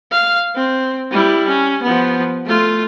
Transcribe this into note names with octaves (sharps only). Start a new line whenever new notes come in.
F5
C4
G3 E4
C#4
F3 B3
A3 F4